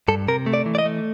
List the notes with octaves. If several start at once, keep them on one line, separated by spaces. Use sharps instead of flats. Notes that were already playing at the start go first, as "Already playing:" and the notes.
G2 A4
C3 A#4
A3
D5
E3
D5
D#5
A3